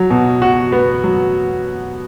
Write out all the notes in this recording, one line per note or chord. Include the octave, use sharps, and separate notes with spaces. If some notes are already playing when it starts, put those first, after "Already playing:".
Already playing: F#3
B2
F#4
B3
F#3